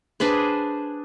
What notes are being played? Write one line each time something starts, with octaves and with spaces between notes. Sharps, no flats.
D4 G#4 B4 C5